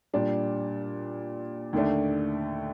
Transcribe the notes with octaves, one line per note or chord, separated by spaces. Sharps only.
A#2 G3 D4
D#2 D3 A3 D4